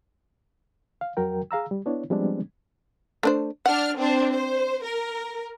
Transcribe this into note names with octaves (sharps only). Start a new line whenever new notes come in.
F5
F2 F#3 F#4 A#4 G5
G#4 F5 A#5 E6
G3
B3 D4 E4 C#5
F3 G3 G#3 B3 C4 D4
A3 D4 C5
D4 F#5 F6
C4 D4 C5
C5
A#4